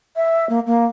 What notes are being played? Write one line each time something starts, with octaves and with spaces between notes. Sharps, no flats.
E5
A#3
A#3